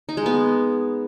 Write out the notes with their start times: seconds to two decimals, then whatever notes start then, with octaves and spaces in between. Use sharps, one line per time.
0.09 D#4
0.17 G#3
0.26 B3